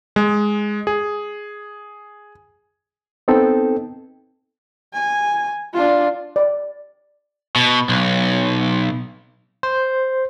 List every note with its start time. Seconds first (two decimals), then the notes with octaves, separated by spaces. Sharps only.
0.16 G#3
0.87 G#4
3.28 B3 C4 D#4 A4 G5
4.93 G#5
5.74 D4 F4
6.36 D5
7.56 B2
7.89 B1
9.63 C5